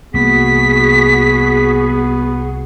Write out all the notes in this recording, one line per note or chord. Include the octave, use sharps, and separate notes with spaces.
C2 A#3 B3 F#4 G#4 B6